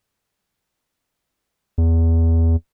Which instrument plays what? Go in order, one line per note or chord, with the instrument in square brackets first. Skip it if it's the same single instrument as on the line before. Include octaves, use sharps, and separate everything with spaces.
[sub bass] E2